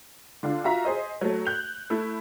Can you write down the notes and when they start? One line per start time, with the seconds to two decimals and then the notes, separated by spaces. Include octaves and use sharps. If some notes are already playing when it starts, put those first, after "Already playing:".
0.43 D3 D4 F4
0.64 F4 F#4 E5 A#5 B6
0.85 G#4 C5 D#5
1.21 F#3 A3
1.46 F#6 G6 F7
1.90 A3 E4